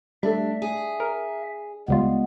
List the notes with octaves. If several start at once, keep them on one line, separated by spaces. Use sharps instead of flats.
G3 A3 D4 E5
G#4
A#4
C#2 G3 G#3 B3 F4